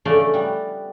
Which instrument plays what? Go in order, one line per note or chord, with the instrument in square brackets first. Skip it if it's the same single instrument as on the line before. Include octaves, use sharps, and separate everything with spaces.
[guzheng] C#3 F3 A3 D5 F5
G3 B3